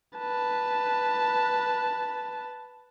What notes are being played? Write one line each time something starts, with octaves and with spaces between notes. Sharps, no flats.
B4 A5